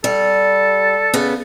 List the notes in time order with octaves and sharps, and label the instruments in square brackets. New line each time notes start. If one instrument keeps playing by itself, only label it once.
[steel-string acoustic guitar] G3 [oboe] A4
[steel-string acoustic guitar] C#3 B3